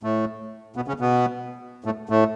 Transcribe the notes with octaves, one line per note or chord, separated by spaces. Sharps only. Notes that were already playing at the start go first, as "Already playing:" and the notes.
A2 A3
B2 B3
C#3 C#4
B2 B3
A2 A3
A2 A3